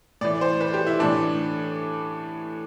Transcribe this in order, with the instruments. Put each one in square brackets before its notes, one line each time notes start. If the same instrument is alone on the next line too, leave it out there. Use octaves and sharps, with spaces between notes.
[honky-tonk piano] A2 E3 D5
C5
B4
G4
E4
A2 E3 D4